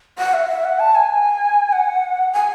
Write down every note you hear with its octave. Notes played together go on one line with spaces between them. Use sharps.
F#5
E5
E5
F#5
A5
G#5
F#5
G#5